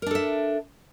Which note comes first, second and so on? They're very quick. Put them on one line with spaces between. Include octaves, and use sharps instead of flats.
A#4 D4 A4 E5